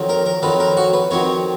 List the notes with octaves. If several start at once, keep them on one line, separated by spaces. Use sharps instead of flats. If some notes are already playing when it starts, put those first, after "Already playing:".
Already playing: F2 D#3 F#3
A#4
A#4
F2 D#3 F#3 B4
A#4
F#4
B4
F2 D#3 F#3 C#5